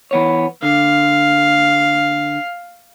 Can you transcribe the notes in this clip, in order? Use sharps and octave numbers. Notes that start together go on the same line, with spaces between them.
E3 B3 C#5
D3 F5